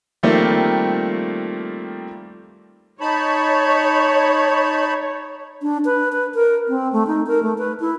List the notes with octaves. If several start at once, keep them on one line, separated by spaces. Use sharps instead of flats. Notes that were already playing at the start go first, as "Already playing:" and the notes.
D#3 F3 G3 A3 A#3 C4
D#4 C#5 A5 B5
D4
B4
B4
A#4
C4
A3
D#4
A#4
A3
B4
E4